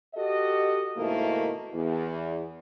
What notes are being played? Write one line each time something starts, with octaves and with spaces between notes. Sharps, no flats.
F#4 G4 A4 D#5
G#2 B2 D#3 A3 A#3 E4
E2